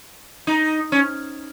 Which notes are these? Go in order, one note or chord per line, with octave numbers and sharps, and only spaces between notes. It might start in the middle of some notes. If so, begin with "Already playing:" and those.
D#4
C#4